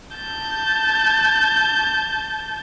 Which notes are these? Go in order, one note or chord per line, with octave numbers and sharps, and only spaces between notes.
A5 G6